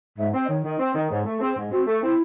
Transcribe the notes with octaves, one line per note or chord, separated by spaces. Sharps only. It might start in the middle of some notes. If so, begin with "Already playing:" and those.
G#2 E5
C4
D#5
D#3 C#5
D#3
C4
D#3
G#2 C#5
A3
C4 G#4
G#2
C4 F#4
A3
C4 E4